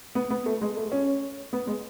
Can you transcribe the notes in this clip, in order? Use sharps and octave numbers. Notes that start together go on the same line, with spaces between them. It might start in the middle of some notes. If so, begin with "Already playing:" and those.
B3
B3
A3
G#3
A3
C#4
B3
G#3